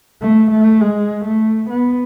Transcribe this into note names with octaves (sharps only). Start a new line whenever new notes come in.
A3
A3
G#3
A3
B3